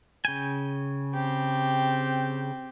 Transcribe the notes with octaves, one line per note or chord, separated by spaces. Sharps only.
C#3 G5 G#5
C4 G4